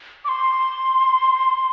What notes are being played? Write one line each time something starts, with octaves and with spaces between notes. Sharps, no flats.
D6
C6